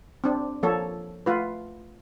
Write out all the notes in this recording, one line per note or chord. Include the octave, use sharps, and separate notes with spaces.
C4 D4
F3 A#3 A4 C#5
A3 F4 B4